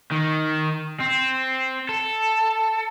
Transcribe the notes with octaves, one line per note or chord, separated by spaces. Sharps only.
D#3
C4
A4